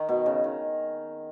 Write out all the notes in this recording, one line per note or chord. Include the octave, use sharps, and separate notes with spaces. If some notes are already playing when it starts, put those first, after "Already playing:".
Already playing: D#3
B2
C#3
D#3